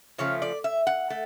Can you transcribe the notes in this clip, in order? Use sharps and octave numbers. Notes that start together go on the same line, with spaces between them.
C#3 F3 A3 C#5
D5
E5
F#5
A3